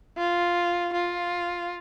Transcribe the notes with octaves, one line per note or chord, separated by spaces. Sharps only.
F4
F4